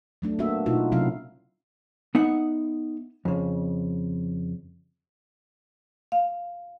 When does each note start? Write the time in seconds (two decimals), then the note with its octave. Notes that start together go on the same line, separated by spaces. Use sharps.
0.22 F#3 A3 D4
0.39 A#3 B3 D4 F#4 E5
0.66 B2 D#4 F4 F#4
0.92 C3 F#3 C#4 E4 F5
2.15 B3 D#4 E5 F#5
3.25 F2 C#3
6.12 F5